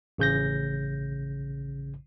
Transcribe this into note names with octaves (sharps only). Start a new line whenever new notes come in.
A1 C#3 G6 A#6